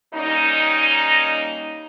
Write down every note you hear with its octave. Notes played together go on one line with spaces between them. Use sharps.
G3 A#3 C#4 D#4